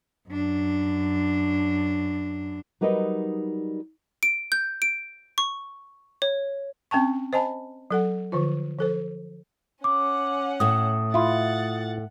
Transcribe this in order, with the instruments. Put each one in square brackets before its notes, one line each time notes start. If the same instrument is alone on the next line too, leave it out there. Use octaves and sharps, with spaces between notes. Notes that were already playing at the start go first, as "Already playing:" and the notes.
[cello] F#2 D4
[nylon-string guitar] F#3 G3 D#4 A#4 B4 D#5
[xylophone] D7
G6
D7
C#6
C#5
[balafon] C4 C#4 G5 A5 C#6
C5 D#5 G#5 A5 B5
F#3 A4 F#5
D3 F3 F4
F3 A4 C5
[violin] C#4 F#5 [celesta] D6
[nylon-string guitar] A2 A3 [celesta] D#6
[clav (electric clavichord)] E4 F4 [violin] F#5 A6